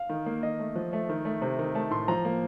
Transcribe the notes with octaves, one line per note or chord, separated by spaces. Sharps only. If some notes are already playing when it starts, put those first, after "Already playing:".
Already playing: F5
D#3
A#3
D#3 D#5
A3
F3
A3
D#3
A3
C3
D#3
A3 A5
A2 C6
F3 A#5
A#3